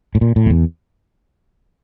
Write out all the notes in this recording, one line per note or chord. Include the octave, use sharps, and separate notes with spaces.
A2
A#2
A2
F2
E2